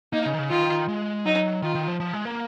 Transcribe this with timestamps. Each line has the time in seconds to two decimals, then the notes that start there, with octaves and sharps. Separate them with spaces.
0.13 A#3 D#4
0.26 C#3
0.33 D#3
0.39 C#3
0.50 D#3 F4
0.88 G#3
1.26 F#3 D#4
1.63 D#3 F4
1.75 D#3
1.88 F3
2.00 F3
2.13 G#3
2.25 A#3